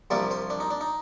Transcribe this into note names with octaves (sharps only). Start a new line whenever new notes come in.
C2 C3 F3 A#3 D4 D5
C5
D4
D#4
D4
D#4